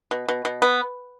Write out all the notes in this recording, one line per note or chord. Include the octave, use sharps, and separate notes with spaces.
B2
B2
B2
B3